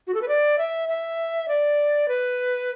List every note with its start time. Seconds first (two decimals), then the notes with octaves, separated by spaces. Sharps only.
0.07 F#4
0.14 A4
0.22 B4
0.28 D5
0.58 E5
0.89 E5
1.48 D5
2.08 B4